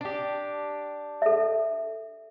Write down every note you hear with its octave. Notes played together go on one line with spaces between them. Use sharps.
D4 G4
A4 E5